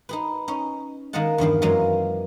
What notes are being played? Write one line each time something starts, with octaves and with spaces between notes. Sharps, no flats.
D#4 G#4 B4
C#4 D#4
D#3 G#3 A#3 D#5 F#5 A5
E2 G2 D#3 F3
F#2 E3 F#3 G#3 A#3 F4